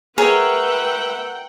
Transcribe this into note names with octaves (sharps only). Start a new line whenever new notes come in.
G#4 A#4 B4 C#5 E5 F#5 G5